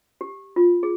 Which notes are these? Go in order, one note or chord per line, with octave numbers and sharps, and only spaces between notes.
G4
F4
G#4